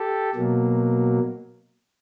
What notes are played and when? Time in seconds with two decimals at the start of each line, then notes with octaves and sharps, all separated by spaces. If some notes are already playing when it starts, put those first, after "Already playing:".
Already playing: G4 A4
0.35 B2 F#3 A#3